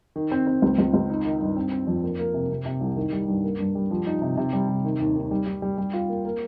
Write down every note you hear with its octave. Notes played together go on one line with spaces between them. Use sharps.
D#3
C4
C4
C#2
C#2
C#2
D#4
D#3
G2
C4
C4
F2
A#3
A#3
C3
C3
C3
C2
D#3
G3
G2
A#3
G2
G3
F3
D#4
C3
C3
G3
C3
D#3
D#2
D#3
G3
G3
G3
G3
F4
A#3
A#3